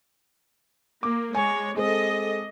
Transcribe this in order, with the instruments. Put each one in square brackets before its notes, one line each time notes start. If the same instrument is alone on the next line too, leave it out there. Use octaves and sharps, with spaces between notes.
[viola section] A#3 [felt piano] D6
[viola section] G#3 C#5 [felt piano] G#5
[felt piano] G#3 C4 [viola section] A4 D#5